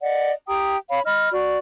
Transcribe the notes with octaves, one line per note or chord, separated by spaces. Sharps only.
D5 D#5 F#5
G4 G5 A#5 D#6
C#5 F5 B5
D#5 B5 F6
F#4 D5